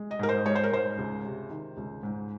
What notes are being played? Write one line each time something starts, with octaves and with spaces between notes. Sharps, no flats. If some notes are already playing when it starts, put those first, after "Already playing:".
Already playing: G#3
D#5
G#2 A#4
C5
G#3 C#5
C5
A#4
G#2 C5
C#2
C3
D#3
C#2
G#2